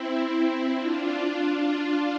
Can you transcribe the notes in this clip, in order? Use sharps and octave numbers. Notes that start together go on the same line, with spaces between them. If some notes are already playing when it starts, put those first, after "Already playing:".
Already playing: C4 E4
C4 E4
D4 F4
D4 F4